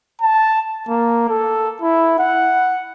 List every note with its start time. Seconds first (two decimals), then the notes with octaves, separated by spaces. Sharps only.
0.21 A5
0.88 A#3
1.29 A4
1.82 E4
2.19 F#5